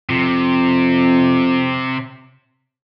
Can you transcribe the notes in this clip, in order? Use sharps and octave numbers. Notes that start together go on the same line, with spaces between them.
F2 C3